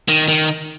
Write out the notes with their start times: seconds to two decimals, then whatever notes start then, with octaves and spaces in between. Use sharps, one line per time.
0.09 D#3
0.28 D#3